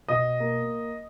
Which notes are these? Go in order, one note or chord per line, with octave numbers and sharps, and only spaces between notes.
B2 D#5
A#3